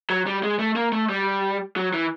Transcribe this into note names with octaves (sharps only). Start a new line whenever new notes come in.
F#3
G3
G#3
A3
A#3
A3
G3
F#3
E3